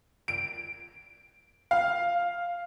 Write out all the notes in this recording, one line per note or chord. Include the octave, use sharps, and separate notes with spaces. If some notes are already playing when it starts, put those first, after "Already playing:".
D7
F5